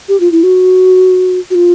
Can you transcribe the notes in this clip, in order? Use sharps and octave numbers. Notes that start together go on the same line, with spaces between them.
G4
F4
E4
F#4
F#4
F4